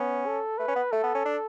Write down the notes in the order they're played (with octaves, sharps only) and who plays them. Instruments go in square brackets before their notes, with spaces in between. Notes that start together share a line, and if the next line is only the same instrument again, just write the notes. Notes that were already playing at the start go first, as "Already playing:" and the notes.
Already playing: [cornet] B3 [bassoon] C#4
[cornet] A4
[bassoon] A3 [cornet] B4
[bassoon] C#4
B3
[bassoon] A3 [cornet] A4
[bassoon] B3
C#4
D4